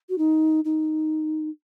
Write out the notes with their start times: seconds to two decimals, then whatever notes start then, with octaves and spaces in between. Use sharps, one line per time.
0.09 F#4
0.18 D#4
0.65 D#4